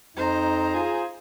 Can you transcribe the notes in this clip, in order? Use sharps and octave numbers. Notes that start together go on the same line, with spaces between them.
F2 D#4 C5 A#5
F4 G#4